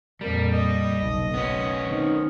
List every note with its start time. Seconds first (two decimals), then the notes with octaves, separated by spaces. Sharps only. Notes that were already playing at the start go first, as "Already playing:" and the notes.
0.21 F2 A#2 G3 A#4
0.52 D#5
0.99 F#1 B1
1.34 B1 B3 C#4
1.85 D#3 C4